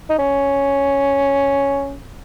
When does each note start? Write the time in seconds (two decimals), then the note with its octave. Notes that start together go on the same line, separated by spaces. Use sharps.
0.09 D#4
0.18 C#4